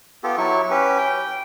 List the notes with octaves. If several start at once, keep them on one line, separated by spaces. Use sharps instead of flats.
B3 F4 G4 A4
F#3 E4 C#6
C#4 G4 B4
G5